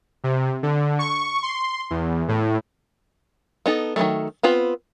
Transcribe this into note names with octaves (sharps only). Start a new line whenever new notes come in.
C3
D3
C#6
C6
E2
A2
B3 D#4 A4
D#3 E3 F#3 A3
B3 C4 F4 B4